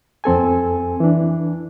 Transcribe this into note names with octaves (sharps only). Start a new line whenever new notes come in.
F2 C4 A4 G#5
E3 D4